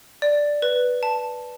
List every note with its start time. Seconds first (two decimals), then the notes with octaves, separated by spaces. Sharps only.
0.22 D5
0.62 B4
1.03 A5